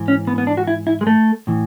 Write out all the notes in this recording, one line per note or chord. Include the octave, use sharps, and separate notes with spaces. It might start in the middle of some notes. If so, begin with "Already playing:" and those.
Already playing: G#2 E3
C#4
B3
B3
D4
F#4
E4
E4
G#3
A3
A2 E3